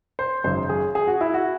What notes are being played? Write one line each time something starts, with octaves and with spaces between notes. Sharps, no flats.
C5
G#1 F#2 C#3 C5
G#4
G#4
F#4
E4
F#4